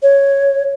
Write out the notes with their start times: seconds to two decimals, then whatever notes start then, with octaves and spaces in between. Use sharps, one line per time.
0.03 C#5